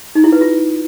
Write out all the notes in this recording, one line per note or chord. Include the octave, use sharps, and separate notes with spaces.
D#4
E4
B4
F4